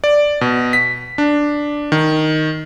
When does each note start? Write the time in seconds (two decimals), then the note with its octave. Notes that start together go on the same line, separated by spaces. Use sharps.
0.04 D5
0.41 B2
0.73 B6
1.18 D4
1.92 D#3